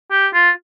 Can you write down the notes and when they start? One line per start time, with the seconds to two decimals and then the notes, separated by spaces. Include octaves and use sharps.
0.11 G4
0.34 F4